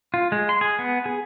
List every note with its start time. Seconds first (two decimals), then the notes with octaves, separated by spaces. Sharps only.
0.14 F4
0.32 G#3
0.49 C6
0.61 G#4
0.79 B3
1.06 G#4